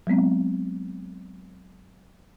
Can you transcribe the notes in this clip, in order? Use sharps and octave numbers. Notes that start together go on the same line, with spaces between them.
F#3 G#3 B3 C4